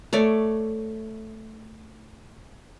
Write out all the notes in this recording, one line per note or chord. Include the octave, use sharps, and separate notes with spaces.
A3 C#5 D5